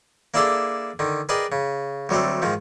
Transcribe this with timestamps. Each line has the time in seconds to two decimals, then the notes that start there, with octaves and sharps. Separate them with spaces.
0.34 A#3 D4 E4 G#4 A4 D5
0.99 D3 D#3
1.29 G#4 A#4 B4 D5 D#5 G5
1.52 C#3
2.09 D2 F#3 G3 A3 C4
2.42 G#2 D#3 F3